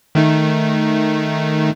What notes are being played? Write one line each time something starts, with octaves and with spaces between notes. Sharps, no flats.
D#3 A3 D#4